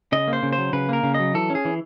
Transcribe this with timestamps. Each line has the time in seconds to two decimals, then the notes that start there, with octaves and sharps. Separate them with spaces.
0.12 C#3 D#5
0.28 A#3
0.33 C5
0.43 C#3
0.53 C5
0.58 F#3
0.73 C#3 B4
0.89 A#3 A#4
1.03 C#3
1.14 D#5
1.20 F#3
1.34 E3 A4
1.50 C#4
1.55 G#4
1.65 E3